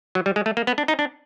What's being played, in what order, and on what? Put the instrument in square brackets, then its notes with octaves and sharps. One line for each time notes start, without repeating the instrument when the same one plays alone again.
[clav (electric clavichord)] F#3
G3
G#3
A3
A#3
B3
D4
D#4
D4